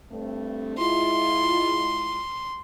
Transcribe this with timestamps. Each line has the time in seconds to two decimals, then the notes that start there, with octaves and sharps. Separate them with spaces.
0.11 G2 A3 C4
0.78 G#3 E4 F4 C6